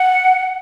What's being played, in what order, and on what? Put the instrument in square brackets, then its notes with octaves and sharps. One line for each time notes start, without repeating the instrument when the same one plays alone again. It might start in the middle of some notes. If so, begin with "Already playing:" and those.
Already playing: [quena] F#5